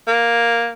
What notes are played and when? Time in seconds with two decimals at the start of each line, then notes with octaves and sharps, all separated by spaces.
0.07 A#3